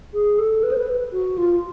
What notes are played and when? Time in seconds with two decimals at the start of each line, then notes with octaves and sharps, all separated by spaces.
0.14 G#4
0.39 A4
0.63 B4
0.72 C5
0.78 B4
1.13 F#4
1.38 F4